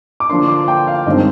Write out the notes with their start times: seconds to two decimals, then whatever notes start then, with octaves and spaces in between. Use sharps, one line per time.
0.20 D6
0.30 D3 F3 A#3 D4 C6
0.48 D6
0.68 G5
0.87 F5
1.06 G2 D#3 G#3 C4 D#5